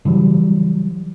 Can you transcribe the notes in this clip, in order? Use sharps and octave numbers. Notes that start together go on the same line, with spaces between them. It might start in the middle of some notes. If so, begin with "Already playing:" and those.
C#3 E3 F#3 G3